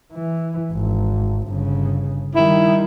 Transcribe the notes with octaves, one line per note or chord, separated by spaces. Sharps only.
E3
G#1
G1 C#3
D#3 G3 E4